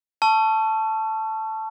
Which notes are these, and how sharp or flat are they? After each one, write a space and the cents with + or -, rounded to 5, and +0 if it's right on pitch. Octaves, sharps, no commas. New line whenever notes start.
A5 +0 C#6 +0 E6 +45